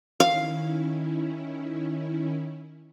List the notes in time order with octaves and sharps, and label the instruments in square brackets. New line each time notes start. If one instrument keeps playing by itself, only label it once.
[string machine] D#3 C#4 E4 [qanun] F5